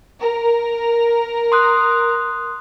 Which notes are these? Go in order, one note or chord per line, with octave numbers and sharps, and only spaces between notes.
A#4
C6 D#6 F#6